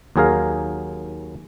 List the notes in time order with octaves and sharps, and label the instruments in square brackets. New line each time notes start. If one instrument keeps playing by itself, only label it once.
[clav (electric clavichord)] D#2 F#3 G#4 A#4 F5